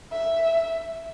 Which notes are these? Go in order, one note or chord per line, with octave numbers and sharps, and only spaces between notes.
E5